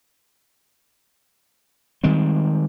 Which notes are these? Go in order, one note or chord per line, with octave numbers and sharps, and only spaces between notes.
D#3 G3 G#3 C4